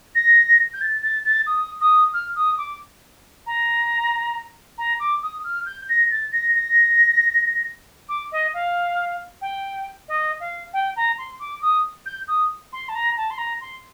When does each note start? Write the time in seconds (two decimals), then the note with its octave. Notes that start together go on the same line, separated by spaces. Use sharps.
0.14 A#6
0.73 G6
0.81 A6
1.02 A6
1.25 A6
1.46 D#6
1.80 D#6
2.13 F6
2.35 D#6
2.57 D6
3.46 A#5
4.77 A#5
4.99 D6
5.22 D#6
5.44 F6
5.65 G6
5.88 A#6
6.10 A6
6.31 A#6
6.54 A#6
8.08 D6
8.31 D#5
8.53 F5
9.41 G5
10.08 D#5
10.40 F5
10.73 G5
10.96 A#5
11.17 C6
11.39 D6
11.61 D#6
12.05 G6
12.27 D#6
12.72 C6
12.88 A5
12.94 A#5
13.17 A5
13.30 C6
13.37 A#5
13.60 C6